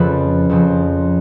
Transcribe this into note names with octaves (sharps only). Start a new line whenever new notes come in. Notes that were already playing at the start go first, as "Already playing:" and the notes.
Already playing: F2 C#3 F3 A4 B4
F2 C#3 F3